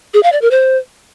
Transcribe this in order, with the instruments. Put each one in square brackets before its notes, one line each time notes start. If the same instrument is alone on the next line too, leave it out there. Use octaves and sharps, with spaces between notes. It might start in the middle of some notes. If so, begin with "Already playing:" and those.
[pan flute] G#4
F5
D5
A#4
C5